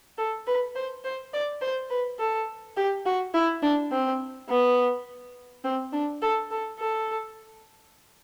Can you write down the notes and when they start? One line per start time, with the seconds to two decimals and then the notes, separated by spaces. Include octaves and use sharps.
0.18 A4
0.47 B4
0.76 C5
1.04 C5
1.34 D5
1.61 C5
1.90 B4
2.19 A4
2.77 G4
3.06 F#4
3.34 E4
3.62 D4
3.92 C4
4.49 B3
5.64 C4
5.93 D4
6.22 A4
6.51 A4
6.79 A4